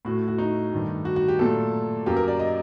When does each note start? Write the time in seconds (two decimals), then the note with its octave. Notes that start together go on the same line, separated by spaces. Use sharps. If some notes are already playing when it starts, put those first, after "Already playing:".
0.05 A2 A3 F#4
0.28 F#4
0.38 D#4
0.72 G2 D#3 A3
1.05 F#4
1.16 F#4
1.28 G4
1.39 A#2 F#3 A3 A4
2.06 F#2 F#3 A#3 G4
2.17 A#4
2.28 D5
2.39 D#5